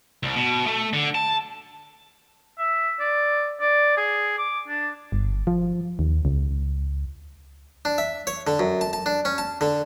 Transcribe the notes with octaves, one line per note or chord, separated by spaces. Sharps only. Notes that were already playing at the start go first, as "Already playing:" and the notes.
C2
B2
A3
D3
A5
E5
D5
D5
G#4
D6
D4
G1
F3
D#2
C#2
D4
E5
C#5
D3
F#2
A5
A5
D4
C#4
A5
D3